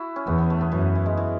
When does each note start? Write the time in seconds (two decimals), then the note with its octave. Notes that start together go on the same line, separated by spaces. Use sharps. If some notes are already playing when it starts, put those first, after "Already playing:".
Already playing: E4 F#4
0.16 C#4
0.27 E2 B3
0.38 B3
0.50 A3
0.61 B3
0.72 F#2 E3
0.95 E3
1.06 G#3
1.17 E3